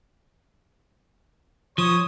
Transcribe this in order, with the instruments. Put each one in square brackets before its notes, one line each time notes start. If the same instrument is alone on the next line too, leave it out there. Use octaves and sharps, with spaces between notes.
[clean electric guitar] F3 [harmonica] C#5 D#6